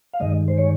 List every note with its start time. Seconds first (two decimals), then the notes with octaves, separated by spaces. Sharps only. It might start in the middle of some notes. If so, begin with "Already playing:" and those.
0.13 F5
0.20 G2 D#3 G#3 D#5
0.48 C5
0.58 C#5